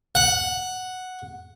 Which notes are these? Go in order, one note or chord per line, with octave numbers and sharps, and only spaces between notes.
F#5